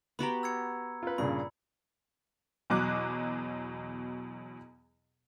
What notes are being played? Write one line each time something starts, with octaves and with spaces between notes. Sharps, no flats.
B3 F#4 G4 A#5 B5
E6 G#6 C#7
F4 B4
G2 A#2 C#3 B5
E2 B2 F#3 D6 F#6